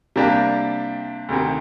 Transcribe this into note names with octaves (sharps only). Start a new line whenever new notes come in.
C3 G3 A#3 D4 G4
D2 C3 D#3